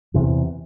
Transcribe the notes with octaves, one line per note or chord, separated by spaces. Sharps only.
E2 C3 E3